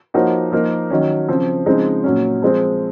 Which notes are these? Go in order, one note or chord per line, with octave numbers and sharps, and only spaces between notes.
F3 A#3 D#4 F#4 C#5
F3 A#3 D#4 A#4
D#3 F#3 C#4
C#3 F3 C4
C#3 F3 G#3 C4 D#4
A#2 F#3 C#4
F3 G#3 C4